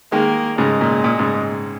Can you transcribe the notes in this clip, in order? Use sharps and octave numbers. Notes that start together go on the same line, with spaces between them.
D#3 G#3 A#3
G#2 C#3 G#3
A#2
A#2
G#2 C#3